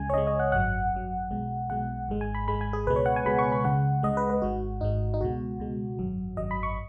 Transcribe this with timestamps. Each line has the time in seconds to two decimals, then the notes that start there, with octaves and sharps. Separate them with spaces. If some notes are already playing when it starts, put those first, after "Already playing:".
Already playing: C#2 C#3 G#3 G#5
0.10 C#5
0.13 C#2 C#3 G#3 D#5
0.27 D#5
0.39 F#5
0.52 G#1 F#2 F#3 F#5
0.92 G#1 F#2 F#3
1.31 B1 B2 G#3
1.70 B1 B2 G#3 F#5
2.09 G#1 G#2 G#3
2.21 G#5
2.35 B5
2.47 G#1 G#2 G#3 B5
2.61 G#5
2.73 G#4
2.87 C#2 B2 G#3 B4
2.96 C#5
3.06 F#5
3.16 G#5
3.25 C#2 B2 G#3 B5
3.39 C#6
3.52 B5
3.64 C#2 C#3 G#3 F#5
4.03 C#2 C#3 G#3 D#5
4.17 B4
4.30 B4
4.42 G#1 G#2 G#3 F#4
4.81 G#1 G#2 G#3 D#4
5.14 D#4
5.21 C#2 B2 G#3 F#4
5.59 C#2 B2 G#3
5.99 G#1 F#2 F#3
6.37 G#1 F#2 F#3 D#5
6.51 B5
6.63 C#6